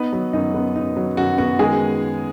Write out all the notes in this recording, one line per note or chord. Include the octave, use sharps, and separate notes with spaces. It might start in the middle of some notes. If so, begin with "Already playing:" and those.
Already playing: B3 D#4 B4
F#3
F#2 D#4
B3
D#4
F#3
F#2 F#4
B3 F#4
D#3 G#3 G#4